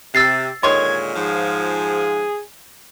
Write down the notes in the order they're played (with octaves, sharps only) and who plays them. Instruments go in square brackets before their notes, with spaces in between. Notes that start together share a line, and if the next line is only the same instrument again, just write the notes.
[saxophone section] C3 [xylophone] E6 A6 C7
[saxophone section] A#2 D3 G#3 [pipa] D#3 C#5 C6 [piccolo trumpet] G#6
[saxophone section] G#2 F3 [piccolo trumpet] G#4